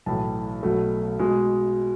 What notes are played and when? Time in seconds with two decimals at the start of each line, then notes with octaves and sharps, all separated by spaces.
0.06 B1 A2 E3 A5
0.63 B1 B2 F#3 A3
1.19 B2 G#3